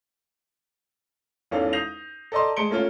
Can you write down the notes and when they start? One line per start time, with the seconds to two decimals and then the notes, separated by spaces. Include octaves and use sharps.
1.51 G#1 E2 C#4 A4 F5
1.73 D#6 G6 A#6 C7 F7
2.32 A4 D5 D#5 A5 A#5 C6
2.57 G#3 A5 C6 C#7 D7 G7
2.70 A3 A#3 C#4 F4